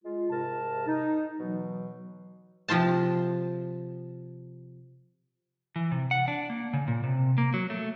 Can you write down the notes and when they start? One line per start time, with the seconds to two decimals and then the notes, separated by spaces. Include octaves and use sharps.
0.04 G#3 F4
0.30 G#2 C3 A#4 A5
0.87 D#4
1.38 B2 E3 F#3
2.68 C3 F3 F4 C5 A5
5.76 E3
5.92 C3
6.11 F#5
6.28 D4
6.50 A#3
6.73 C#3
6.88 A#2
7.04 C3
7.38 A#3
7.54 F#3
7.70 A3